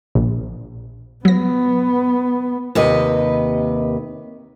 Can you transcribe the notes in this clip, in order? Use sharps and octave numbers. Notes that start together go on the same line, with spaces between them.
A#1
F#3 B3 A#6
D#2 C3 B4 D#5